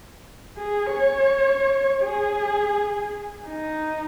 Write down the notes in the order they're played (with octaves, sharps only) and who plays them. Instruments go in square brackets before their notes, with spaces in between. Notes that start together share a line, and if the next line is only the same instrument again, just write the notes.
[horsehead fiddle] G#4
C#5
G#4
D#4